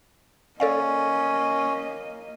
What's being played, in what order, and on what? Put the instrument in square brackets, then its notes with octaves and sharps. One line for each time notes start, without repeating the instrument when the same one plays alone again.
[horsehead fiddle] A#3 D#5 [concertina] C#4 [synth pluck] A4 D5 F5